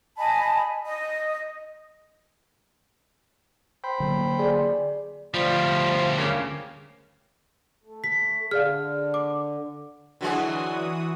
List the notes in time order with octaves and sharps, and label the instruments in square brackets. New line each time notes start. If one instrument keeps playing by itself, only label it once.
[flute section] D#5 G#5 A5 B5
D#5
[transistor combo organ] C5 G5 B5
[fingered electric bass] D3 F#3 A#3
[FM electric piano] G#4 [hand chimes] D5
[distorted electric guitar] D2 G3 [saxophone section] F3
[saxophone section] C#3 A#3
[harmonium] A3
[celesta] B6
[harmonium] D3 [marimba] G#4 D5 F5 [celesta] F6
[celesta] D6
[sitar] D3 F#3 G#3 [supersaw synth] E3 F#4 D#6